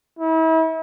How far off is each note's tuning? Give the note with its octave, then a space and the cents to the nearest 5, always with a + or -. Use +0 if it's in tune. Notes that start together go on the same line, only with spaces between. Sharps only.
E4 -40